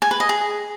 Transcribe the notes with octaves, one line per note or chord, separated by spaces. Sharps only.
G#5
B4
D#5
G#4